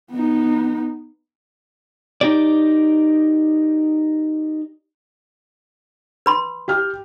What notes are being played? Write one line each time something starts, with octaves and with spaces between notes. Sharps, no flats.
B3 D#4
D#4 G4 D5
B4 B5 C6
G4 G5 F6